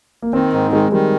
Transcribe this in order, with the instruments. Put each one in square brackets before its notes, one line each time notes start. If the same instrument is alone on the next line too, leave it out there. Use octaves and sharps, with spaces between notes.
[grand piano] A#3
[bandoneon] D#3 [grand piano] C4
[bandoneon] G#2
[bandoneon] D#3 [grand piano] G#3
[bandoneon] D#3 [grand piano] G3